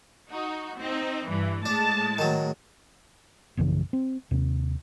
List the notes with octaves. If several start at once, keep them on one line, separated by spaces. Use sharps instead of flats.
D#4 F#4
C4 D#4
G2 E3
A2 G#3 D4 A5
D#3 F#3
A#1 F#2 C#3 E3
C4
D#2 C3